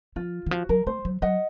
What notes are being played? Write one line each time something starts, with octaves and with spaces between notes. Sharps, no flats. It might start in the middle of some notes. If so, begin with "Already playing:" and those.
F3 F4
D#3
F3 F#4
F#3 A#4
A3 C5
F#3
F#3 D#5 F#5